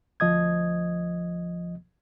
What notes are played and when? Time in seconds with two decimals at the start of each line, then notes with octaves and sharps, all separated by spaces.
0.20 D2 F3 D#5 D#6 G#6